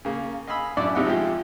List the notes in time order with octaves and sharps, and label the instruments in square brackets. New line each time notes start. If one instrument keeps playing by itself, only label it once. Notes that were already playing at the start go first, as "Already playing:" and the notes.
[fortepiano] C#3 A#3
D#5 F5 G#5 B5 E6
F#2 D4 E4 D5 E6
G#1 C3 D#4 E4 F#5 E6
F3 G#3 E4 F4 G4